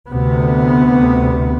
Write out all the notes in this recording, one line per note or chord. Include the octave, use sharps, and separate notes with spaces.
D2 C3 B3